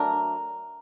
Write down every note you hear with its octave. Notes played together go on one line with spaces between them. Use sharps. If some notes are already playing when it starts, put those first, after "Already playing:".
Already playing: F#3 A3 D4 A#4